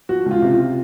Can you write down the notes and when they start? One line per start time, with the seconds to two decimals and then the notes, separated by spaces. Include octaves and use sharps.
0.09 F3 F#4
0.26 C#2
0.31 F4
0.42 C3
0.53 F4